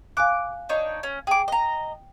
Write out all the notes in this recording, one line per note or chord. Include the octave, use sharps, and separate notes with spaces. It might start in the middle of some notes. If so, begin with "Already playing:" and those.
F5 G#5 D6 F#6
D4 D#4 C#5
C#4
G#4 G5 D6
D#5 A#5